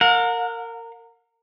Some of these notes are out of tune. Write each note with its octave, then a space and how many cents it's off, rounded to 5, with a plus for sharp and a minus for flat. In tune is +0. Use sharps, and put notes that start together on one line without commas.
A#4 -20 F#5 -45